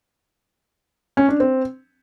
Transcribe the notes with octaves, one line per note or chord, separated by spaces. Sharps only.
C#4
D4
C4